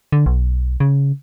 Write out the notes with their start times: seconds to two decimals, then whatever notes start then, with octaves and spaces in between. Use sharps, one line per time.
0.12 D3
0.26 B1
0.80 C#3